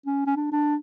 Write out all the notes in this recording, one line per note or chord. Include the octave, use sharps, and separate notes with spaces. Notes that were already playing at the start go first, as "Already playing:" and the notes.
C#4
C#4
D4
D4